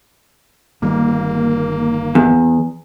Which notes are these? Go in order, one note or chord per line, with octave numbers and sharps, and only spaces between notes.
G1 D#3 G3 A#3
E2